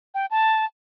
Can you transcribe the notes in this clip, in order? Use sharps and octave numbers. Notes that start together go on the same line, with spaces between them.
G5
A5